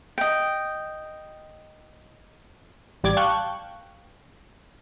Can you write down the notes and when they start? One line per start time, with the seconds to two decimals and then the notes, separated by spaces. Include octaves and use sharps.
0.18 D#5 G5
3.04 A1 G3 D5 D6 G#6 A6
3.17 F5 G5 A5 C#6 F#6 G6